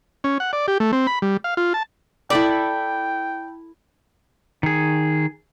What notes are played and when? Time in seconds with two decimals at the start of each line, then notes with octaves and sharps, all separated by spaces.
0.24 C#4
0.40 F#5
0.53 D5
0.68 G4
0.80 A3
0.93 C4
1.07 B5
1.22 G3
1.44 F5
1.57 F4
1.74 A5
2.30 E4 A4 D5 G5 B5
4.63 D#3 G#4